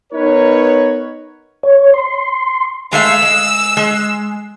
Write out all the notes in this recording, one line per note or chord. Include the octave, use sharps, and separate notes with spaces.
B3 D#4 A#4 B4 C#5
C#5
C6
G#3 A3 F5 E6
G#3
G#3